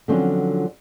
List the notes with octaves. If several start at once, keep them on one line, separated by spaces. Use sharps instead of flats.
D3 F3 F#3 C4 C#4 F4